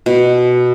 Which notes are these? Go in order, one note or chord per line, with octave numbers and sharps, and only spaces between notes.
B2